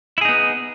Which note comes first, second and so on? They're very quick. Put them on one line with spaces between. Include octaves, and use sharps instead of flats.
E4 G#4 D#4 B3